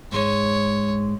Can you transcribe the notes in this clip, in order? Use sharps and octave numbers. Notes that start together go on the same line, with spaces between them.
G#2 G#3 C#5